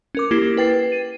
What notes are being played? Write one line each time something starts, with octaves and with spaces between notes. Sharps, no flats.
C#4 A#4 D6
A#3 E4 G4 G#6 C7
B4 G5 A6 C7
D#7